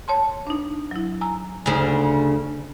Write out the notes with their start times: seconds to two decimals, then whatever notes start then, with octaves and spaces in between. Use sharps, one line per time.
0.08 C#5 A5 C6
0.47 D4 D#4
0.91 F#3 E4
1.21 G#5 A#5 E6
1.66 D2 C#3 D#4 G#5